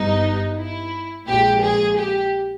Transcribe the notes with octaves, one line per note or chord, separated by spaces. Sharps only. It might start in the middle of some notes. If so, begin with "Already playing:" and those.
Already playing: G1 G2 G3 B3 D#4
E4
A#1 A#2 G#3 G4
G#4
G4